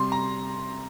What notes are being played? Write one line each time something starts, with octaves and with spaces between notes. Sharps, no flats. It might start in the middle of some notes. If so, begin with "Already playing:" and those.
Already playing: C3 G3 C6
A#5